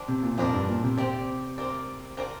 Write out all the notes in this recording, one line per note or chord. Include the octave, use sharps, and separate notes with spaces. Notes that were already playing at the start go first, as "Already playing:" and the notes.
Already playing: F3 D4 G4
C3
A#2
F2 F3 D4 A#4 D5
G2
A#2
C3
C3 C4 G4 D5
C4 G4 A#4 D5
F3 C4 A#4 D5